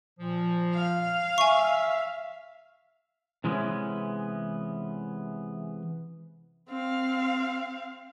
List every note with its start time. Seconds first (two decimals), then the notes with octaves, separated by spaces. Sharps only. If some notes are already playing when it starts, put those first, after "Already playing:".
0.20 A#2 F3
0.74 F5
1.38 E5 G#5 C#6
3.44 C3 E3 G#3 B3 C#4
6.69 C4 F5